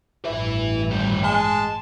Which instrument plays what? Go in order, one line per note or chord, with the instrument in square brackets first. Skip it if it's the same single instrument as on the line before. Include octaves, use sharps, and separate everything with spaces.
[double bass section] A1 G2 [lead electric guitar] B4 E5
[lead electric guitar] D#2 G3
[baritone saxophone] G#3 [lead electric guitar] A5